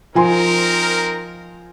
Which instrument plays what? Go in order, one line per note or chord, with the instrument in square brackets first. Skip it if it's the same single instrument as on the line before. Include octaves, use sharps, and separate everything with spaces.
[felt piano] F3 G#5 C6 [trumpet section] C4 D#4 A#4